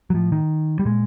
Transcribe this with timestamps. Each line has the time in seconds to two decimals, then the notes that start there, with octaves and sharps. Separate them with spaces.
0.10 F#3
0.14 A2 F3
0.32 D#3
0.79 G3
0.85 A#2 G#3